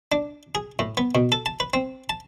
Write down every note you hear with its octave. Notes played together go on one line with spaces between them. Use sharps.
D4
G#4
A2
B3
B2
A4
A5
B4
C4
A5